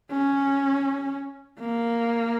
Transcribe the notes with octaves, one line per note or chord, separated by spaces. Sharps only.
C#4
A#3